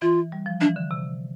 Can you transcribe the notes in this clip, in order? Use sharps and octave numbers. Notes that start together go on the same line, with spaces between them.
E3 F4
G3
F3
E3 D4
D3
C3